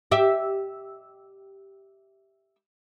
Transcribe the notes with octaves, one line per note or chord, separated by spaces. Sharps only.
G4 E5